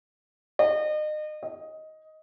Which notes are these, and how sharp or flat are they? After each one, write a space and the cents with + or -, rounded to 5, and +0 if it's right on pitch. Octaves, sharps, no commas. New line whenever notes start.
D#5 -35
D#5 +10